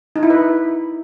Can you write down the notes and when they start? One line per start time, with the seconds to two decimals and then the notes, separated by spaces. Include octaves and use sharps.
0.16 D#4
0.23 E4
0.30 B4